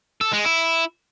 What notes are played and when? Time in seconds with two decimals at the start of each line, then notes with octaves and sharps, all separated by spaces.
0.21 A4
0.33 G#3
0.45 E4